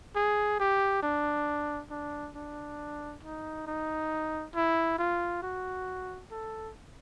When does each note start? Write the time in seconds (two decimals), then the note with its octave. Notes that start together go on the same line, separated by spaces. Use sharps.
0.15 G#4
0.59 G4
1.03 D4
1.91 D4
2.35 D4
3.23 D#4
3.67 D#4
4.55 E4
4.99 F4
5.42 F#4
6.31 A4